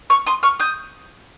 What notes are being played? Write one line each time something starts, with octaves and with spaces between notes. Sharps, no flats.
C#6 F6
C6 D#6
C#6 F6
D#6 G6